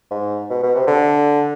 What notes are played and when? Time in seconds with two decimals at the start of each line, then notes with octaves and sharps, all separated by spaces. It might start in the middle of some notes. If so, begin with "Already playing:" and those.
0.11 G#2
0.50 B2
0.63 B2
0.75 C3
0.87 D3